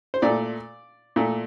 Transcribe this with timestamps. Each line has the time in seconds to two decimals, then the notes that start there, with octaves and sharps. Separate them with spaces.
0.14 C5
0.22 A#2 A3 D5
1.16 A#2 A3